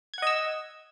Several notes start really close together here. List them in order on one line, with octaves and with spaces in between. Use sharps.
G#6 F#5 D#5 E6